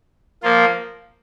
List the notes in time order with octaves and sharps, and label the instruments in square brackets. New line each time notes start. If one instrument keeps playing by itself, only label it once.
[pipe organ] F3 A#3 F4